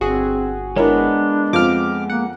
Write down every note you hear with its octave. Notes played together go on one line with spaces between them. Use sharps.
G1 C4 F#4 G#4
G#3 B3 D4 E4 A#4 C#5
F2 F3 D6 F6
A#3 F#5